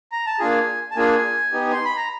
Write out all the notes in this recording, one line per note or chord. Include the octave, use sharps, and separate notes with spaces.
A#5
A5
A#3 D4 F4 G#4 G#5
A5
A#3 D4 F4 G#4 G#5
B3 D#4 G4
C6
B5
A#5